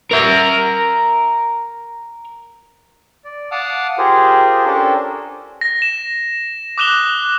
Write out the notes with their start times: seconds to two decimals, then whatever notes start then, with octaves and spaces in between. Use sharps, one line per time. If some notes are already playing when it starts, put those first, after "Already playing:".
0.11 A#4 E5
3.24 D5
3.51 F5 F#5 A5 D6 D#6 F6
3.98 F4 G4 G#4 A#4 C5
4.66 C#4 D4 G4 A4 A#4 C5
5.61 A#6
5.82 E7
6.78 D6 D#6 F#6 E7 F7 G7